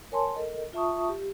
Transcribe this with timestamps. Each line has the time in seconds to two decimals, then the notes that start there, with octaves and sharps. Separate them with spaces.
0.12 A#4 C#5 G#5 A5 C6
0.36 A4 A#4 D#5
0.73 F4 E5 A5 C#6 D#6
1.09 G4